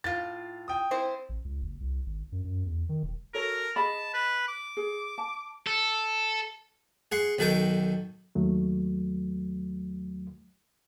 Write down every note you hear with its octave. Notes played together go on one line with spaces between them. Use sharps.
A2 F4 A6
G5 D#6
C4 E4 C5
A1
C#2
F#1
C2
G#1
F#2
F#2
E2
D#3
E1
F#4 A4 A#4 C#5
G#4 D#5 A5 B5
B4
D6
G#4
A5
A4
G#4 F#5 C6
B1 D#3 F#4 A4 G5 D#6
D#2 F#3 A3